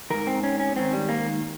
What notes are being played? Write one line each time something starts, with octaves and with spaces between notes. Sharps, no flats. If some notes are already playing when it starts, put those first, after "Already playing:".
G#2 D#3 A#4
C4
C#4
C#4
G#2 D#3 C4
G3
A#3